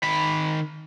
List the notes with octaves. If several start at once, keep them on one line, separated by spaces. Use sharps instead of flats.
D#3 B5